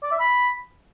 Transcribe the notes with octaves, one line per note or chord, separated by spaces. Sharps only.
D5
E5
B5